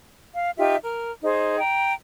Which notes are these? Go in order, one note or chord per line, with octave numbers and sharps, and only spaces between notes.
F5
D#4 F4 G4 E5
A#4
D#4 G#4 C5
G5 A#5